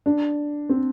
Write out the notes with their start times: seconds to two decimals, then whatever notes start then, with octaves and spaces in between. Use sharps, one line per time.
0.06 D4
0.69 C4